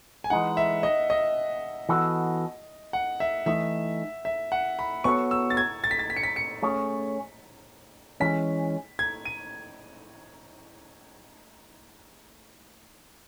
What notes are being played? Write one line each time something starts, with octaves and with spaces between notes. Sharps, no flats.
G#5
E3 G#3 D#4 F#5
E5
D#5
D#5
E3 B3 F#4 A4
F#5
E5
E3 A3 D#4 E5
E5
F#5
B5
B3 F#4 A4 C#5 C#6
E6
A6
G#6
A6
B6
A6
B6
C#7
B6
C#7
A3 C#4 G#4 C#5
E3 G#3 C#4 B6
G#6
D#7